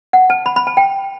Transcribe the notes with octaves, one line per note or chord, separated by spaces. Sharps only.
F#5
A5
B5
B5
A5
G5